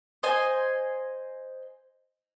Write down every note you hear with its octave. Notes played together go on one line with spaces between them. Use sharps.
C5 D#5 G#5